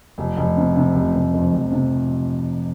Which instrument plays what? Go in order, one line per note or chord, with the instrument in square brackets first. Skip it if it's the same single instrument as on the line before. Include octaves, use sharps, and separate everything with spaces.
[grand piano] F1
F1
C3
C3
F1
F1
F2
F1
C3